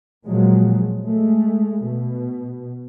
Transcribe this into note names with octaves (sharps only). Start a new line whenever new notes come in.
A#2 F3 F#3 G#3
G#3 A3
B2